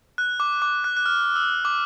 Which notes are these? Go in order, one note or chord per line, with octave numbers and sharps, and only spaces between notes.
F#6
D6
D6
F#6
F#6
F6
E6
D6